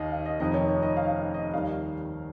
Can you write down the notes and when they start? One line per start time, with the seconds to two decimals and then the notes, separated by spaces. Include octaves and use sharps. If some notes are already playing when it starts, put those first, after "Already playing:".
Already playing: D#2 D#3 D#5 F5
0.12 F5
0.25 D#5
0.40 F1 F2 D#3 D#5
0.54 C#5
0.68 C#5
0.82 D#5
0.97 F5
1.08 F5
1.16 D#5
1.34 D#5
1.53 D#2 D#3 G3 F5